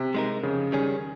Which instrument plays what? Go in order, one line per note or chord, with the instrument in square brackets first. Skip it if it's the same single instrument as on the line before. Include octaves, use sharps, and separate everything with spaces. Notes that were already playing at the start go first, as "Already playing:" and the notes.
Already playing: [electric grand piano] C3
[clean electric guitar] G#3 D#4 A#4
[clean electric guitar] F2 [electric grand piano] C#3
[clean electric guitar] D#3 G3 C#4 G#4